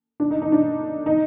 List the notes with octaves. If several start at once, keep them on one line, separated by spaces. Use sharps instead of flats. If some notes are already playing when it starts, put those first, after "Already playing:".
D4
D#4
D#4
D4
D#4